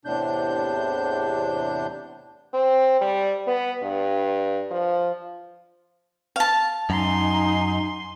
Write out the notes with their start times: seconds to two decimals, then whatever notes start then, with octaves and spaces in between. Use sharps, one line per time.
0.05 E2 A2 C3 D4 G6
2.54 C4
3.01 G3
3.47 B3
3.83 G2
4.71 F3
6.36 F5 A5
6.90 F#2 D#4 G#5 A#5 C6